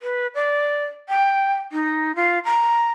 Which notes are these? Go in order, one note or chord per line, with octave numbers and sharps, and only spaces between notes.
B4
D5
G5
D#4
F4
A#5